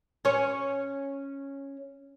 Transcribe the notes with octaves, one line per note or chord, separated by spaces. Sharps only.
C#4 C#5